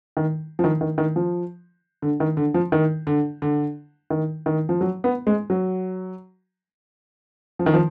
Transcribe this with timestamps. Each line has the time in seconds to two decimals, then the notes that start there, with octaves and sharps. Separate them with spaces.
0.17 D#3
0.59 F3
0.64 D#3
0.81 D#3
0.98 D#3
1.16 F3
2.02 D3
2.20 D#3
2.37 D3
2.54 F3
2.72 D#3
3.07 D3
3.42 D3
4.10 D#3
4.46 D#3
4.69 F3
4.81 F#3
5.04 B3
5.27 G#3
5.50 F#3
7.59 F3
7.66 D#3
7.74 F3